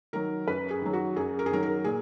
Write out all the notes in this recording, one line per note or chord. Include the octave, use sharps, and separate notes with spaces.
D#3 F#3 A#4
F#2 B4
G#4
D#3 F#3
F#4
F#2 G#4
A#4
G#4
D#3 F#3 A#4
A#4
A#2 G#4